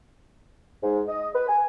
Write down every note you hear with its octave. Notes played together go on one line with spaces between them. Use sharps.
G#2
D#5
B4
G#5